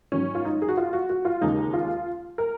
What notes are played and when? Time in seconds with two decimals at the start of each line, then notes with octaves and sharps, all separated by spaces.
0.12 G#2 D#3 F#3 C#4
0.35 F4
0.45 D#4
0.62 G#4
0.68 F#4
0.77 F4
0.93 F#4
1.09 F#4
1.25 F4
1.41 D#2 C#3 G#3 D#4
1.73 F4
2.38 A#4